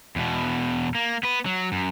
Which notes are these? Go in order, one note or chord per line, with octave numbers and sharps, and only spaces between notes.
E2 B2
A#3
B3 B4
F#3
F#2